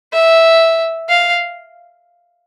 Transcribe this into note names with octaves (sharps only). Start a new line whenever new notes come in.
E5
F5